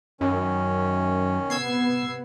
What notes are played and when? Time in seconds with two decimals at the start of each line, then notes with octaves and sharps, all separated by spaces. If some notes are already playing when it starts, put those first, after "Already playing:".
0.21 F#2 D#3 C#4
1.50 C3 B3 E6 G#6 C7